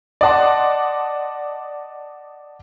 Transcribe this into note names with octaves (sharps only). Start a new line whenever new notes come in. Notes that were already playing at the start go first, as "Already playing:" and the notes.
D5 D#5 F#5 A5 C6